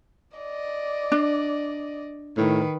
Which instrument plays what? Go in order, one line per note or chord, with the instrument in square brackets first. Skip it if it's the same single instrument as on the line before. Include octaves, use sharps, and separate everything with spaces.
[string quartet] D5 D#5
[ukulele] D4
[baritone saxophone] A2 [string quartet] D#3 B4